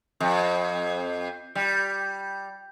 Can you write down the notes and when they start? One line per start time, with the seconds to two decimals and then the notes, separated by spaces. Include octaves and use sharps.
0.20 F2
1.55 G3